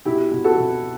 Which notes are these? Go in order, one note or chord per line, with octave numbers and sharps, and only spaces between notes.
B2 E4 G4
B2
F#4 A4
B2